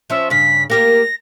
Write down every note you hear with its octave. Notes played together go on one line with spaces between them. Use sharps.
F3 C#4 E5
G2 C#3 B6
A#3 G4 A#4 A#6